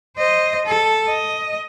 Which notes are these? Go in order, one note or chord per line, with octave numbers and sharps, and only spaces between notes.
C5 D#5
A4
D#5